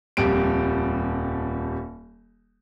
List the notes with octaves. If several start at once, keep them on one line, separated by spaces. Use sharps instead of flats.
D#1 F2 G3 D7